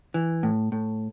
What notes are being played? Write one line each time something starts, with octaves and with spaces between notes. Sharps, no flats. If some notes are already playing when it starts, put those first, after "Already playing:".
E3
A2
A2